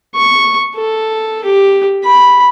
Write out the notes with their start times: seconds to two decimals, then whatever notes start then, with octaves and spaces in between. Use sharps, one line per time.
0.15 C#6
0.75 A4
1.45 G4
2.04 B5